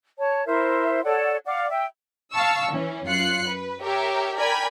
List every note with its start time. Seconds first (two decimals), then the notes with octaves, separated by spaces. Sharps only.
0.19 C#5 A5
0.46 E4 A#4 C5 E5
1.04 A4 C#5 D5 F#5
1.46 D5 F5 F#5 D6
1.69 E5 G5
2.33 F5 A5 C#6 E6
2.72 E3 C#4
3.06 F#2 F4 F#6 C7 C#7
3.47 B4
3.83 G4 A#4 C#5 E5 G5
4.37 A#4 D5 G5 G#5 B5 G#6